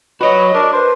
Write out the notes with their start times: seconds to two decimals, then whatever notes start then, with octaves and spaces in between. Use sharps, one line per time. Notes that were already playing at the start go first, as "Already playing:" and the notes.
0.21 F#4 B4 C#5 D#5
0.55 D4 A#4
0.73 B4 C5